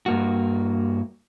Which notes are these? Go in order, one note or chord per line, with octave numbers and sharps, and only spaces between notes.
G2 A#3 F#4